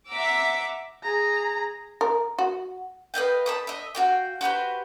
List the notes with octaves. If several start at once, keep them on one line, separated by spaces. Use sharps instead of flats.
E5 F#5 A#5 D6 E6
G#4 A#5
A#4
F#4
B4 D#5 F5 G5
A5 B5 D#6
D#5 E5
F#4 F5 G5
F#4 G4 B4 C5